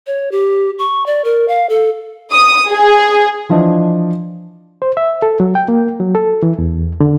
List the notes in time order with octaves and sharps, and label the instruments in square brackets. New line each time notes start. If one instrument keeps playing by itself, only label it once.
[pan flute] C#5
G4
C#6
D5
A#4
F5
A4
[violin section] D#6
G#4
[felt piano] E3 F3 D4 D#5
[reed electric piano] C5
E5
A4
F#3
G5
A#3
F#3
A4
E3
E2
D3